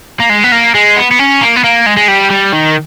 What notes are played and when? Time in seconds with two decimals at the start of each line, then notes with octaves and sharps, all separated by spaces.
0.20 A#3
0.30 G#3
0.44 B3
0.52 A#3
0.75 G#3
0.97 B3
1.11 B3
1.19 C#4
1.41 A#3
1.56 B3
1.64 A#3
1.86 G#3
1.97 G#3
2.08 G3
2.31 G3
2.53 D#3